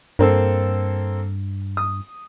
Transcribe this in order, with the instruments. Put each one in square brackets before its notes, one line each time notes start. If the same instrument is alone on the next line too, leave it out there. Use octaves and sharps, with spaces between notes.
[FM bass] G2 [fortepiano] A#3 C4 A4
[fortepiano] D#6